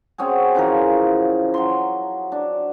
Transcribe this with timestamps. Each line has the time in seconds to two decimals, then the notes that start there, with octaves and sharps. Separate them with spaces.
0.18 C4 C#4 F#4 G#4
0.55 C#3 E3 F3 A#4
1.54 F#3 C6
2.32 D4